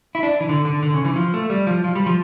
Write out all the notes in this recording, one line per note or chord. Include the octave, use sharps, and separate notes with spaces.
E4
D4
E3
D3
D3
D3
C#3
E3
F3
A3
G3
F3
F3
G3
F3